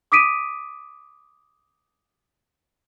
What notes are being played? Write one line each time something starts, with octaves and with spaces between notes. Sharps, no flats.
D6 D#6 B6 D7 D#7